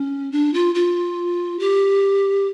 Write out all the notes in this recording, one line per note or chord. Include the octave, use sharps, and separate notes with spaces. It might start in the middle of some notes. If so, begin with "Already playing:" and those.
Already playing: C#4
D4
F4
F4
G4